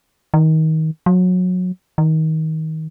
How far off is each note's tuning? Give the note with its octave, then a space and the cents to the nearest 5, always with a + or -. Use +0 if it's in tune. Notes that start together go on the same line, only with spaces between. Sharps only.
D#3 +25
F#3 -25
D#3 +25